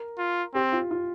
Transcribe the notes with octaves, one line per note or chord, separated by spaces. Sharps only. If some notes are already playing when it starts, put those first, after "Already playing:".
Already playing: A#4
F4
C4 G4
F4
F4